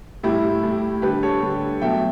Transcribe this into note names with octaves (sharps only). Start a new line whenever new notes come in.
A2 G3 E4 G4
A2 G3
D3 G3 G4 B4
A4 C#5
D3 G3
B2 F#3 A3 E5 G5